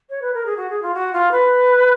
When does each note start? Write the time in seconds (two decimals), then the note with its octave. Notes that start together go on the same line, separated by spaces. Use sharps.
0.09 C#5
0.21 B4
0.34 A#4
0.45 G#4
0.57 F#4
0.69 G#4
0.82 F4
0.94 F#4
1.13 F4
1.31 B4